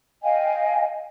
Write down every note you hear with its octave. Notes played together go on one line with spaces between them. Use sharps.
D#5 F5 G5 G#5